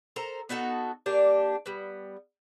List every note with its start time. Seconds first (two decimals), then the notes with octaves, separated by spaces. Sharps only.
0.16 A4 A#4 C5 A#5
0.49 B3 D#4 F#4 A4
1.06 A#3 D4 G4
1.66 G3 B3